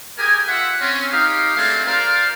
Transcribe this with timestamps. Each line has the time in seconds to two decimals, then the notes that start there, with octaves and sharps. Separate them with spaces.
0.19 G4 G#4 A#4 G#5
0.48 F4 E5 F#5
0.80 C4 C#4
1.12 D#4 G4 F5
1.56 G#3 A3 C4 D4 G#4 F5
1.87 F4 A#4 C5 D5 F5